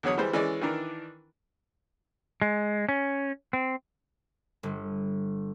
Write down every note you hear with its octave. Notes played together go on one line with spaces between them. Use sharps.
E2 D3 F#3 C#5 D#6
E3 G3 G#3 C5
E3 G#3 C#4 D5
D#3 E3 D4 A#4
G#3
C#4
C4
G1